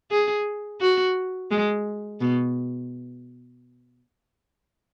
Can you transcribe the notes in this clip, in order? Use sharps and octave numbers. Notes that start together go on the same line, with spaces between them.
G#4
F#4
G#3
B2